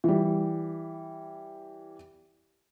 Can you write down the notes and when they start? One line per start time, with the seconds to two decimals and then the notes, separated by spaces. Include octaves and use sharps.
0.04 E3 G3